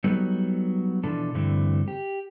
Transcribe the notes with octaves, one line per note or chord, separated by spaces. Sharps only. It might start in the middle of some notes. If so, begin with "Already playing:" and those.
F#3 G3 B3 D#4 A4
B2 E3 F3 D4 A4
G2 D3 E3 A3 C4
G4